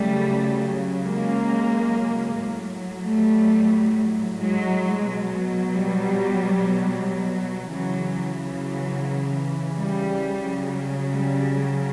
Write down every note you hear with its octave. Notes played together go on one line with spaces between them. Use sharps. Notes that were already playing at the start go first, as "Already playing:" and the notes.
Already playing: C#3 F#3 G3 A3
G#3 A#3
A2 F#3
G3 A3
F#3 G#3
B2 F#3
G3
C#3 E3 F#3
F#3
G3
C#3 F#3
G3